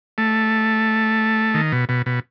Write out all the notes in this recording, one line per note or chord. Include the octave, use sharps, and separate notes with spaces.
A3
D#3
B2
B2
B2